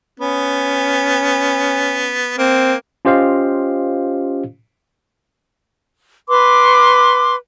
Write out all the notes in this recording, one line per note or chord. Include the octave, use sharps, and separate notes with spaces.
B3 C#4
A#3 C4
C#4 F4 G4 C5 D#5 F5
B4 C6 D6